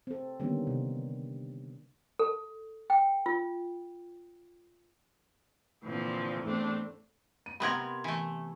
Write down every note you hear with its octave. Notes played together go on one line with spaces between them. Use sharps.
C4 A4
D3 D#3 G3 A#3 B3 C#4
C3
A4
G5
F4
A#2 D3 E3 F3 C4
E2 A2 A3 C4 D4
D#7
C3 B3 A#4 B5 C6 G#6
E3 A3